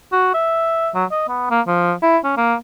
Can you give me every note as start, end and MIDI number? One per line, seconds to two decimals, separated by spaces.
0.12 0.30 66
0.34 0.89 76
0.94 1.05 54
1.11 1.24 75
1.29 1.48 59
1.50 1.61 58
1.67 1.94 53
2.03 2.18 64
2.24 2.36 61
2.37 2.55 58